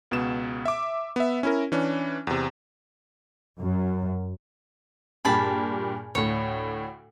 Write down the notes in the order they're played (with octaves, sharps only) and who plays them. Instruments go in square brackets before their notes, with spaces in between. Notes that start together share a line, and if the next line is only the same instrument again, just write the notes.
[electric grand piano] C#2 B2 B3 E7
E5 D6
B3 E5
C#4 E4 A#4
E3 C#4 D4
E2 C3
[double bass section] F#2
[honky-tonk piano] G2 A#2 G4 [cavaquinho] G#4 A5 B5
[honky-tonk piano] D2 A2 [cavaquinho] C#5